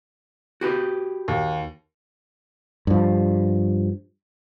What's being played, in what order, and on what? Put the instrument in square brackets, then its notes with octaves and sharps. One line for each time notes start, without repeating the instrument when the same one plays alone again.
[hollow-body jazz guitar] F#4 G4 B4
[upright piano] D#2
[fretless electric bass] G2 F3